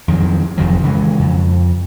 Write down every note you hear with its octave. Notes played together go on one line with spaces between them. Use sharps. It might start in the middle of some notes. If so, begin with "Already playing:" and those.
F2 D#3 F#3
F1 F2 D#3 F#3
C#3 E3 G3 G#3
F2